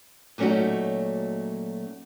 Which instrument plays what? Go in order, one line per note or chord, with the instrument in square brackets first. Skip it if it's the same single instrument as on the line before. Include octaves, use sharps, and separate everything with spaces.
[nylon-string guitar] A#2 F#3 A3 C#4 D#4 F#4